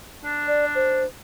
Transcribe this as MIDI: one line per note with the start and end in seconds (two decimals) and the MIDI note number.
0.24 1.04 62
0.47 0.65 74
0.75 1.04 72